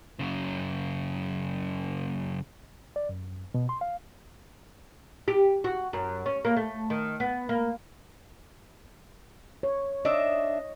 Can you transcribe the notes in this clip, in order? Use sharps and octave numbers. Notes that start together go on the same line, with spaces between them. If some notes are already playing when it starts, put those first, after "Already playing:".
F#2 C#3
D5
F#2
B2
C6
F5
G4
F#4
F#2
C#4
A#3
A3
D#3
B3
A#3
C#5
D4 D#5 E5